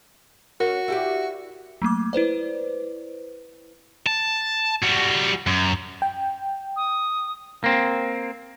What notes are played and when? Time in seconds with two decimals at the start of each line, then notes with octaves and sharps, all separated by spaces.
0.60 C#4 F#4 A#4
0.88 E4 G4 D5
1.82 F#3 A3 A#3 D6
2.13 E4 B4 C5 D5
4.06 A5
4.83 G3 F#4
5.47 F#2
6.02 G5
6.76 D#6
7.64 A#3 C4